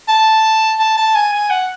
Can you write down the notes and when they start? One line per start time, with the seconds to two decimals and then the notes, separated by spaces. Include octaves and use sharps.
0.08 A5
0.79 A5
0.97 A5
1.15 G#5
1.33 G#5
1.50 F#5